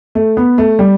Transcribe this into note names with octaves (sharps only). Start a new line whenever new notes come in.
A3
B3
A3
G3